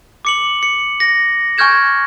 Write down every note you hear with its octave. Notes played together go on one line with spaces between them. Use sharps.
D6 C#7 F#7
C#7
A#6
G#5 C#6 F6 G6 G#6 E7